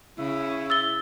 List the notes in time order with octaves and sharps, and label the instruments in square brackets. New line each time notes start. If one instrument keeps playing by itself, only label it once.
[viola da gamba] C#3 [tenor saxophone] E4
[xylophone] E6 A6 G7